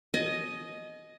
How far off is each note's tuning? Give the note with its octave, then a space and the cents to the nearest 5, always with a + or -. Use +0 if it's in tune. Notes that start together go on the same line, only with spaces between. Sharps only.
D#5 +0 G#5 +40